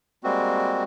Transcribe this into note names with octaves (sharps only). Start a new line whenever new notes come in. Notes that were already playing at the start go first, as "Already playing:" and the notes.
G3 G#3 A#3 C4 F#4